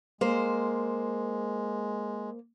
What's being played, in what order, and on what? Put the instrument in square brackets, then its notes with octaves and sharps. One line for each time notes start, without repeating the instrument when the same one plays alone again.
[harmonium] G#3 [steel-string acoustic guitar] A#3 C5